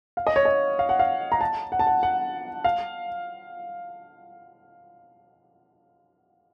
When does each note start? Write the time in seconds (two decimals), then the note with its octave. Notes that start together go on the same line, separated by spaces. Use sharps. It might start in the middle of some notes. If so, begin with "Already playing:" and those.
0.17 F5
0.27 D#5
0.36 C#5
0.45 D#5
0.79 F5
0.89 F#5
0.99 F5
1.32 A#5
1.41 A5
1.72 F#5
1.79 A5
1.87 F#5
2.03 F#5
2.64 F5